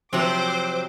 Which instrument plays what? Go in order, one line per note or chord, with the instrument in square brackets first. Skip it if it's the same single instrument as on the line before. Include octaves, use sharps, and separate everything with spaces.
[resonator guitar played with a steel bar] C3 F#3 [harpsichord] F3 [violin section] C5 D6